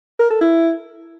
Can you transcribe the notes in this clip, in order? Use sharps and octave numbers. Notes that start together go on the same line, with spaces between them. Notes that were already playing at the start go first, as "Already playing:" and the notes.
A#4
A4
E4